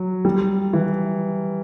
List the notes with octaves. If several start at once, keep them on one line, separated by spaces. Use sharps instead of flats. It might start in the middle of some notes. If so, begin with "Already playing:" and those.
Already playing: F#3
G3
E3